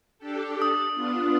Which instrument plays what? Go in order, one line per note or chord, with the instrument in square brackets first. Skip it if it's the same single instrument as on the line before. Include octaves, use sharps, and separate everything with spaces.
[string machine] D4 G4 A4
[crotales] D#6
[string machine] B3 D4 F4